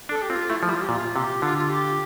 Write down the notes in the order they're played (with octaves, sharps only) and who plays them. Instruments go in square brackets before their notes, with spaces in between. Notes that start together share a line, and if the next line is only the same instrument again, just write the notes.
[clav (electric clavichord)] D4 [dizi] A4
[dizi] G4
[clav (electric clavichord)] C4 [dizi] F4
[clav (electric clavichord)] A3 [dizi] E4
[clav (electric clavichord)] F3
[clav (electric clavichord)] G3 [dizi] F4
[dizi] G4
[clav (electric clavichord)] A#2 [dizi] F4
[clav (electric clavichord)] C3 [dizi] G4
[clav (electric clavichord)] D3 [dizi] F4
[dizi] F4
G4